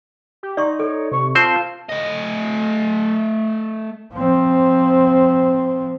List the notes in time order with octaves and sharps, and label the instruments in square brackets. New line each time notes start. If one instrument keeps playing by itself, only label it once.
[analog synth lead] G4
[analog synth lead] D#4 [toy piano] D5 C6 C#6
[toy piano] A4 [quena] C#5
[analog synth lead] C3 [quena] C#6
[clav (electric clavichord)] C4 C5 [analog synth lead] F4 [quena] A5
[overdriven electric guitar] A3 D#5
[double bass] F3 C4